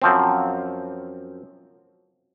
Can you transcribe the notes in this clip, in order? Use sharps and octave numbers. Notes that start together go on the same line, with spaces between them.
F#2 F3 C4